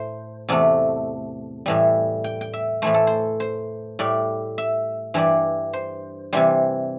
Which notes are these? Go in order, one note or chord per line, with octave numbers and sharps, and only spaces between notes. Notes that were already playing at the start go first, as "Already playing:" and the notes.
Already playing: A2 A3 C5
E2 C3 A3 D5
A2 E3 G3
G5
G5
E5
A2 E3 A3 C5
A4
C5
C5
A2 G3 D5
E5
G2 E3 G3 D5
C5
C3 E3 G3 C5